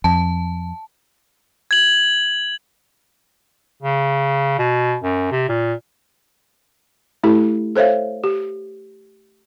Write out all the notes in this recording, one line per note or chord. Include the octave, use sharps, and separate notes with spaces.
F2 A5
G#6 F#7
C#3
B2
F#2
C3
A#2
A3 E4 G4 A4
A4 C5 C#5 E5 F5
G4